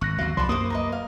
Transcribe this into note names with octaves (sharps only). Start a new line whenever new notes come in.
G#1 C#6 F#6 A#6
D#2 F#3 F5
C2 F3 D5 A5 B5 C6
F#2 A#3 C5 D6 D#6
A#4 B4 D#5
F5